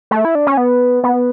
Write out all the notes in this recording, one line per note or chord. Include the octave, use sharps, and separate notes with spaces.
A3
E4
D4
C#4
B3
B3